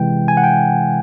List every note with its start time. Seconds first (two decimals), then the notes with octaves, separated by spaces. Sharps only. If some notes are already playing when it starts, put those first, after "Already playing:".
Already playing: C3 E3 G#3 G5
0.28 G#5
0.37 F#5
0.44 G5